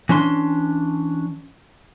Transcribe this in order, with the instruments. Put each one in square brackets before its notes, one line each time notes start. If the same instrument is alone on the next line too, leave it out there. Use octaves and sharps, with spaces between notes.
[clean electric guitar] E3 C#4 D4 C6